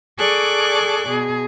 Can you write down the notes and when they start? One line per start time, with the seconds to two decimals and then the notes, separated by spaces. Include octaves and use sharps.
0.18 G#4 A4 D5 C#6 D6 F#6
1.08 B2 G#4